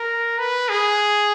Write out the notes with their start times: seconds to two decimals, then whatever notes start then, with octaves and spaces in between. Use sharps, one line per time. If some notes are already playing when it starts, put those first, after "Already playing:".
Already playing: A#4
0.39 B4
0.69 G#4